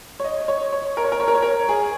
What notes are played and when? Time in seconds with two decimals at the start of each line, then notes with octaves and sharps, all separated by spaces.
0.20 C#5
0.24 D#5
0.48 C#5
0.72 C#5
0.97 A#4
1.04 C#5
1.12 A#4
1.20 C#5
1.28 A#4
1.35 C#5
1.42 A#4
1.69 G#4